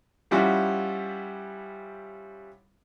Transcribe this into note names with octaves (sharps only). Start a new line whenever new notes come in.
F3 G3 C#4 E4 F#4